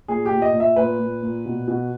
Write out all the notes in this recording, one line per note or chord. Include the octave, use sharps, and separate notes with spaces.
A#2 G#4
G4
A#2
D#5
A#2
E5
A#2 B4
A#2
A#2
B2
B2